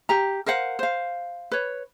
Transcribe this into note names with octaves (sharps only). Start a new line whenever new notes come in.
G4 A#5
A#4 C5 F5 F#5
C5 F5
B4 C#5